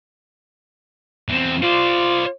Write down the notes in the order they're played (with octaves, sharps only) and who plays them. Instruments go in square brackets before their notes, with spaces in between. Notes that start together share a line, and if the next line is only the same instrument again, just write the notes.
[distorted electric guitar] E2 C4
[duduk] F4 [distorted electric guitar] C5 D5